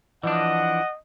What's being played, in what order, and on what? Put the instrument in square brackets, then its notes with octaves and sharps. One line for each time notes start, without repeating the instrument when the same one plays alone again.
[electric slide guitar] E3 F3 D4 [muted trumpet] D#5 [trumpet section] F#5